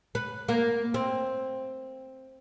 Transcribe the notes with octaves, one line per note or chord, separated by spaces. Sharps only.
B4
A#3
C4